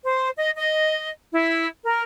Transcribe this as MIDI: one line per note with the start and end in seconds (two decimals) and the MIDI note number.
0.03 0.29 72
0.38 0.52 75
0.55 1.09 75
1.31 1.67 64
1.84 2.03 70